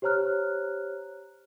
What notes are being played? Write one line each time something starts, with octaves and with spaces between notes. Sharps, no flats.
G4 C5 C#5 A#5 F6 F#6